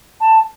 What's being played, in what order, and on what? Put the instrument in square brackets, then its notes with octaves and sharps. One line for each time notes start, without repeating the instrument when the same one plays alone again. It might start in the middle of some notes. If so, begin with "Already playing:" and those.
[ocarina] A5